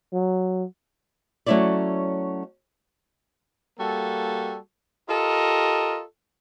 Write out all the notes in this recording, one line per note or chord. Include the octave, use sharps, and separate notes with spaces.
F#3
F#3 A3 C#4 E4 C#5 D5
G3 A#3 F#4 A4
F4 G4 A4 A#4 D#5